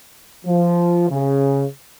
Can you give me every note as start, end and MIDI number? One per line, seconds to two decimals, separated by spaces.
0.46 1.07 53
1.10 1.65 49